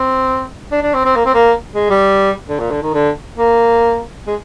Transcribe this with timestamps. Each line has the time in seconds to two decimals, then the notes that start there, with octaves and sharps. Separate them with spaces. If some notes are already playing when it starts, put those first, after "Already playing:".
Already playing: C4
0.72 D4
0.83 D4
0.94 C4
1.05 C4
1.16 A#3
1.25 C4
1.34 A#3
1.75 G#3
1.90 G3
2.49 D3
2.60 A#2
2.71 D3
2.82 D#3
2.94 D3
3.38 A#3
4.27 G#3